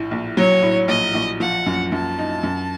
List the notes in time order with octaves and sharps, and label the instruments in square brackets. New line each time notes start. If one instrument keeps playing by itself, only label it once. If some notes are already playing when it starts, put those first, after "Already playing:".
Already playing: [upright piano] A#1 A2
A#1
[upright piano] F#3 [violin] C#5
[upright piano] A2
[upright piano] A#1 [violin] D#5
[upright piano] A#1
[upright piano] F3 [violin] F#5
[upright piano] F#2
[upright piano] F#2 [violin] A5
[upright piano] D#4
F#2